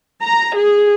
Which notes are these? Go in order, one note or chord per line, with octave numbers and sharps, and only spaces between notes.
A#5
G#4